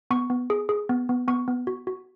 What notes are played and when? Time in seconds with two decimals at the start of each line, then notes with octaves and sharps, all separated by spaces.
0.11 B3 C#6
0.30 B3
0.50 G#4
0.69 G#4
0.89 B3
1.09 B3
1.28 B3 C#6
1.48 B3
1.67 F#4
1.87 F#4